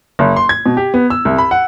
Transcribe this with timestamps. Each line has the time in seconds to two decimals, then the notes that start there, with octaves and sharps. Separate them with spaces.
0.19 F#1
0.36 C6
0.49 G#6
0.66 B2
0.77 G4
0.94 B3
1.10 E6
1.25 C2
1.38 B5
1.51 F#5